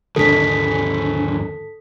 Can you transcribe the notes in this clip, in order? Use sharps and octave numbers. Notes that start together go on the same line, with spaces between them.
D#2 G#2 D3 A4 B6